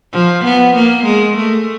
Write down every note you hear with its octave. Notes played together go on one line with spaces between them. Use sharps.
F3
B3
A#3
G#3
A3